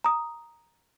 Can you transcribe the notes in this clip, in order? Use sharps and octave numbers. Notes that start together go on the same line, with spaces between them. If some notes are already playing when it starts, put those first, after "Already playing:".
A#5 D#6